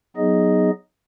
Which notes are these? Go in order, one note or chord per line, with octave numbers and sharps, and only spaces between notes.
F#3 B3 D#4 G#4 D#5